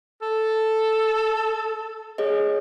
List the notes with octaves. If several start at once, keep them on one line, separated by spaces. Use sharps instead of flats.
A4
G#4 C#5 D#5